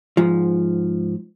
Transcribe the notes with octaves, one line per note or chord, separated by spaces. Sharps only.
G#2 F3